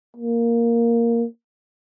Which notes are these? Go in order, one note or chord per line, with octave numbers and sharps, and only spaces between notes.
A#3